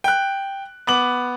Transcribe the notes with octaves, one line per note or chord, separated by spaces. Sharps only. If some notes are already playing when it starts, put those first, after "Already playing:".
G5 F#6
B3 D6 F#7